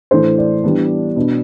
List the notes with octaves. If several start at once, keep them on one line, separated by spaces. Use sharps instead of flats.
A2 E3 A3 D4 C5
D5
E3 G3 B3 D4
B2 B3 D4